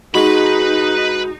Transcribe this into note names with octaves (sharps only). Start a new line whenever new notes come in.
G#3 D#4 F#4 B4 B5